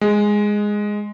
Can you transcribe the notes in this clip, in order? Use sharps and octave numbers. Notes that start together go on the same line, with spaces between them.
G#3